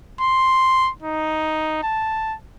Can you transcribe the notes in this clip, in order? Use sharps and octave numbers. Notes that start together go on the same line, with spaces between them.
C6
D#4
A5